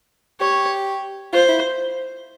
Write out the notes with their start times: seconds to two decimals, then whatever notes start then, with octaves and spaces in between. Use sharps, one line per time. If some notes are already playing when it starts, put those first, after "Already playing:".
0.40 G4 C#5
1.33 F4 C5
1.49 E4